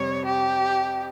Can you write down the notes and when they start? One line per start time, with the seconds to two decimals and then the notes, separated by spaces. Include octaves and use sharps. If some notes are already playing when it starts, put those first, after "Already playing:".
Already playing: F2 C3 G3 C#5
0.26 G4